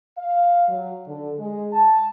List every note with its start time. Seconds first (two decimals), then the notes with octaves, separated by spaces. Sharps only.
0.18 F5
0.68 F#3
1.07 D3
1.38 G#3
1.73 A5